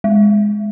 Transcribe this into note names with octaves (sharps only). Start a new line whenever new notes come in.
G#3